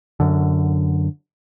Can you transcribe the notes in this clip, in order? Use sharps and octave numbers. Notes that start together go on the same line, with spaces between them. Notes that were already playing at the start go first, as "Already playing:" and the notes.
F#2 D3